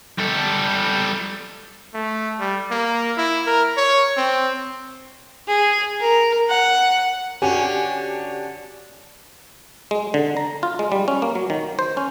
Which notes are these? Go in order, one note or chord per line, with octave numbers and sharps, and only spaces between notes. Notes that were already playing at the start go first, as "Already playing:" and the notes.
G3 A4
A3
G3
A#3
E4
A#4
C#5
C4
G#4
A#4
F#5
D3 C#4 F#4 G4 G#5
G#3
D3
A#5
F4
G#3
G3
C#4
A#3
F#3
D#3
C5
C#4